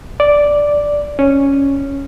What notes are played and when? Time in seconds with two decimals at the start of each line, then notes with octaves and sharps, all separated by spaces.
0.20 D5
1.19 C#4